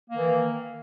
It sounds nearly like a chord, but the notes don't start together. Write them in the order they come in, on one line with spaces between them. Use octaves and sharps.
A#3 D#3 E3